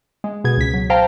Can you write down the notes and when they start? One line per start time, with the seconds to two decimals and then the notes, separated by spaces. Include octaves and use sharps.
0.24 G#3
0.44 B2 G#4 G#6
0.58 C#2 B6
0.74 F#3
0.90 C5 F5 G5 A5 A#5